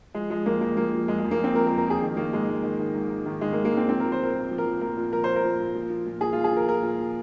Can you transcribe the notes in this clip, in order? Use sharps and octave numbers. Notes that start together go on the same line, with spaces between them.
F3 G#3
F3 G#3
F2 A#3
F2 A#3
F3 A#3
F3
F2 G#3
G#3
F2
A#3
F3 C4
F3 A#4
A#4
F2
A#4
F2 G#4
D#3
D#3 A#3
G#2 G#3
G#2
D#3
D#3
G#2
G#2
D#3
D#3 G#3
A#3
G#2
A#3
G#2 C4
F3 C4
A#4
F3
C5
A#2 A#4
A#2
F3
A#4
F3
A#2 A#4
A#2
F3 A#4
F3 C5
A#4
A#2
A#2
F3
F3
A#2
A#2 G#4
F4
F3
G#4
F3 A#4
A#2 A#4
A#2
F3